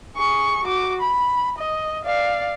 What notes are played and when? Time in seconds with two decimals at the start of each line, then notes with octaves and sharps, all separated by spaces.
0.17 G#4 C#6
0.65 F#4 D6
1.01 B5
1.58 D#5
2.05 D5 F5